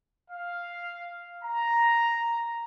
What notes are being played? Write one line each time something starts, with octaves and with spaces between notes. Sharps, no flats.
F5
A#5